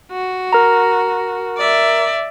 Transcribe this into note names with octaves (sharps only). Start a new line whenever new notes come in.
F#4
A#4 A#5
D5 E5